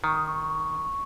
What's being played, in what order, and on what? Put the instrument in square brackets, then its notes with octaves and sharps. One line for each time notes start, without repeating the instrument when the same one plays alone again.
[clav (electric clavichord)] D#3 [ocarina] C#6
[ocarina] D#6
C#6